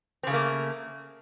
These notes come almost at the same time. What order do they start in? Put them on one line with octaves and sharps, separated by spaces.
C4 C#3 A3 A#3